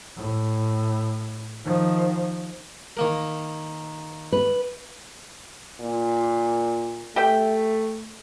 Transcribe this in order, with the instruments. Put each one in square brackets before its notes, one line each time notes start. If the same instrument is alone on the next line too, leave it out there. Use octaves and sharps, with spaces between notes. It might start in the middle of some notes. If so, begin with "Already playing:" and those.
[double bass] A2
D#3 F3
[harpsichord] D#3 A#3 A#4
[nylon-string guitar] B4
[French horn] A#2
[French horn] A3 [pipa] G4 E5 G5